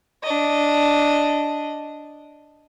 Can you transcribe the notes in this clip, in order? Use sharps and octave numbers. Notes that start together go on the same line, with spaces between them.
D4 D#5